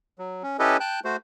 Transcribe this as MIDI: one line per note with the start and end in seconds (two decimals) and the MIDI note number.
0.19 0.43 54
0.43 0.57 61
0.59 0.77 61
0.59 0.77 64
0.59 0.77 67
0.59 0.77 69
0.59 0.77 71
0.59 0.77 75
0.80 1.00 79
0.80 1.00 81
0.80 1.00 90
0.80 1.00 91
1.05 1.17 57
1.05 1.17 66
1.05 1.17 72